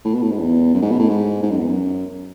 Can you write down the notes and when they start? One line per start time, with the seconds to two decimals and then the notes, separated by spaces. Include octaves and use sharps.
0.05 A2
0.14 B2
0.22 A2
0.31 G#2
0.39 E2
0.74 F#2
0.82 G#2
0.91 B2
1.00 A2
1.08 G#2
1.43 G#2
1.51 F#2
1.59 E2
1.67 F#2